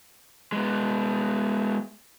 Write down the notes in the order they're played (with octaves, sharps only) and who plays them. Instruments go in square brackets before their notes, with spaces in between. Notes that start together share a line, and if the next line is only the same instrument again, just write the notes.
[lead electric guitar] G#3 B3